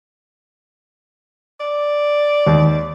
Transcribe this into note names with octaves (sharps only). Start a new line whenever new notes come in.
D5
D#2